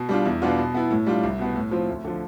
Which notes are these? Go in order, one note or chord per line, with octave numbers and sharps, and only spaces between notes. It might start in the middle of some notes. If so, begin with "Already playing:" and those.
Already playing: B2
G3 D4 F4
E2
B2 B3 D4 F4
B2
B3 E4
A2
G3 D4 F4
C2
B2 B3
A2
F3 C4 F4
D2
D3 F3